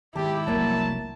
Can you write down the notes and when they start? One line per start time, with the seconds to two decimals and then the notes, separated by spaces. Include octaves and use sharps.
0.16 D#3 G#3 E4 G4 A5
0.47 F1 C2 F#3 A#3 A5